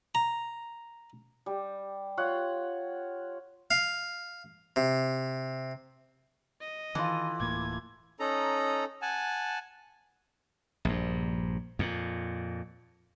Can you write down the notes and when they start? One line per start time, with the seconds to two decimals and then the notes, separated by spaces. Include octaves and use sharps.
0.15 A#5
1.46 G3
2.17 F4 C#5 F#5
3.71 F5
4.76 C3
6.61 D#5
6.95 D#3 E3 F4 A4
7.40 D1 A2 A#3 G#6
8.20 C#4 D#4 A4 A#5
9.02 F#5 G#5 A5
10.85 A#1 G2
11.79 F2 A#2